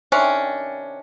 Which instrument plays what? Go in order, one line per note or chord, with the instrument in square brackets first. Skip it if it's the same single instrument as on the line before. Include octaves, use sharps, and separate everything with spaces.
[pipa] C3 D#3 C#4 D4